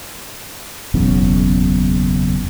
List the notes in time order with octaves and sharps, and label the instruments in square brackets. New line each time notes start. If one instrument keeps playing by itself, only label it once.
[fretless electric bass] F#1 B1 E2 C#3